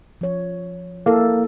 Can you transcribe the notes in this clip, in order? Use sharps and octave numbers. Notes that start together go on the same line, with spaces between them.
F3 C#5
A#3 E4 A4